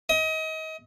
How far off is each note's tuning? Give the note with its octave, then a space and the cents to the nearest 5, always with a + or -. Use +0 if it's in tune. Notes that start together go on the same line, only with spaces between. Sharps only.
D#5 +30